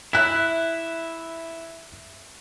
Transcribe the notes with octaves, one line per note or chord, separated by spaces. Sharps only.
E4 E5 F#6 B6